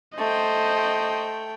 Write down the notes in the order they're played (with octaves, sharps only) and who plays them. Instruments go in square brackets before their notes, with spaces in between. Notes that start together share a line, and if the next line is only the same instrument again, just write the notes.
[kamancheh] A3 G5 [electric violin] C5 D#5